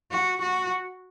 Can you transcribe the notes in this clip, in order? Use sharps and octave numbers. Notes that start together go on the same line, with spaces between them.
F#4
F#4